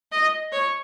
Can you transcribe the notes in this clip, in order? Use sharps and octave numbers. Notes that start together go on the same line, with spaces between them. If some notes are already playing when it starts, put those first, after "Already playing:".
D#5
C#5